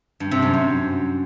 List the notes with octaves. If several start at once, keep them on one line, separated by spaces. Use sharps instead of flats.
G2
C3
F#2
F#3